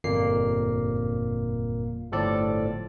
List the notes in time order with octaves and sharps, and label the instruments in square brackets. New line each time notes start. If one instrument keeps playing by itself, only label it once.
[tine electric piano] G1 F2 A#2 A#3 C7
G1 A2 F3 A4 D5